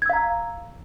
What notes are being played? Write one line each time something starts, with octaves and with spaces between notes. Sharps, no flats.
F5 A#5 E6 G#6